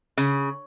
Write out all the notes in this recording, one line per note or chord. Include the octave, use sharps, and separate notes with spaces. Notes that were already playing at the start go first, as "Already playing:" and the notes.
C#3